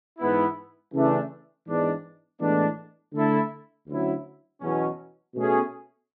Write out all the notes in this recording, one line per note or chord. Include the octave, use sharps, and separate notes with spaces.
G#2 E3 B3 E4
C#3 E3 A3 D4
G#2 E3 G#3 B3 D4
A2 E3 G#3 B3 D4
D3 A3 E4 A4
D2 D3 F#3 C#4 E4
E2 B2 F#3 C#4
B2 A3 C#4 G#4